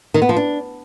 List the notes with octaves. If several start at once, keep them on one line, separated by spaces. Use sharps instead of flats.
D#3
B3
F3
D4